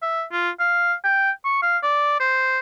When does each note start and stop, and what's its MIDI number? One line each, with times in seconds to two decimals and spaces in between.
0.02 0.23 76
0.32 0.50 65
0.60 0.93 77
1.04 1.31 79
1.45 1.59 85
1.62 1.78 77
1.83 2.18 74
2.20 2.59 72